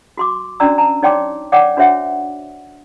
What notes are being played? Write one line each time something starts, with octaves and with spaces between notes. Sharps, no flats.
F#4 C6 D6
C#4 D4 F#4 D5 A#5 E6
A5 A#5
D#4 C#5 D5 G5 C6 D6
C#5 D5 F#5 G5 D6
D4 F#4 C5 C#5 E5 F#5